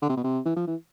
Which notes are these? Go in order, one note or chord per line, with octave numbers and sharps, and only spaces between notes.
D3
C3
B2
C3
E3
F3
E3